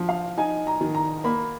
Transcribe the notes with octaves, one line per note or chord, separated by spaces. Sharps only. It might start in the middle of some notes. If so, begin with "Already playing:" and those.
Already playing: F3 D4
F5
D#4 G#5
A#5
D#3
A#5
A#3 B5